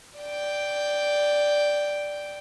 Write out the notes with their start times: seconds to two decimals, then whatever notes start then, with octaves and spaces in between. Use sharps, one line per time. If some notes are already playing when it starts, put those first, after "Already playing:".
0.19 D5 G5